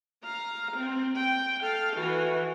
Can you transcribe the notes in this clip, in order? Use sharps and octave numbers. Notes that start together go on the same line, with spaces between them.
F5 A#5
C4
G5
A4 F5
E3 F#4